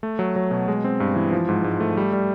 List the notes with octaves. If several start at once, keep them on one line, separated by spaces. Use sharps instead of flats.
A3
F#3
F#3
B2
G#3
C4
G2
E3
F3
G#2
G#2
A3
G3
G3